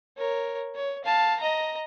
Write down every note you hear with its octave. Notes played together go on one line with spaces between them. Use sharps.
A#4 C#5
C#5
F5 A5
D#5 A#5